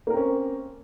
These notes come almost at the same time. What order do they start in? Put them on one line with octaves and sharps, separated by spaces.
A#3 A#4 C4 C#4